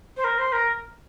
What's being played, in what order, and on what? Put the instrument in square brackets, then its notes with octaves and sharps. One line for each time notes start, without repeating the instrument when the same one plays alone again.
[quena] C5
A#4
C5
A#4